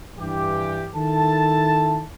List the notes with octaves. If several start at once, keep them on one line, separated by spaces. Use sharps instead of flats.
G2 E3 G4
D#3 E4 A4 A5